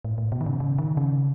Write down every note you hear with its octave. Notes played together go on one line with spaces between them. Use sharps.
A2
A2
B2
D#3
C#3
C#3
D#3
C#3